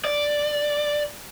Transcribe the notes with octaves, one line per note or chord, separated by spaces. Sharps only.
D5